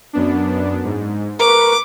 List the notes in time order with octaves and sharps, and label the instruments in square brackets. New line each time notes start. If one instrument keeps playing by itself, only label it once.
[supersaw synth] F#2 B3 D4
G#2
[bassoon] A#4 [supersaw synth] B4 C#6 [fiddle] D6